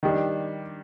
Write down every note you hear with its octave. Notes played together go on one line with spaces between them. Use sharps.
D#3 G3 D4